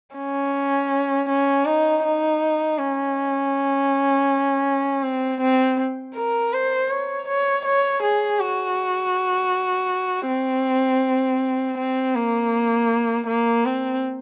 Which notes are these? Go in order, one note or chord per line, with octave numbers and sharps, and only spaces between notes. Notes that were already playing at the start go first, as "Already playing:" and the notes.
C#4
C#4
D#4
D#4
C#4
C4
C4
A#4
C5
C#5
C#5
C#5
G#4
F#4
C4
C4
A#3
A#3
C4